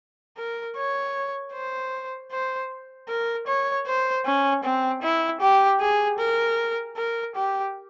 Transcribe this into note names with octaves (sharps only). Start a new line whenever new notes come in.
A#4
C#5
C5
C5
A#4
C#5
C5
C#4
C4
E4
G4
G#4
A#4
A#4
G4